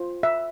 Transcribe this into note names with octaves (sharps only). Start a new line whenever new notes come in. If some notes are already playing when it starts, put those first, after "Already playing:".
Already playing: F4 C5
E5